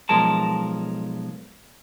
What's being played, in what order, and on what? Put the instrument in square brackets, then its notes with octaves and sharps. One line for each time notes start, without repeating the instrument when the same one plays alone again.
[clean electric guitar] B1 F3 G#3 A#4 A5